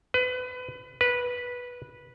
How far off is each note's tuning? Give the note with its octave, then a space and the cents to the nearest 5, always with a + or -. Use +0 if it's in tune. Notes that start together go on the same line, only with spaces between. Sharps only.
B4 +30
B4 -10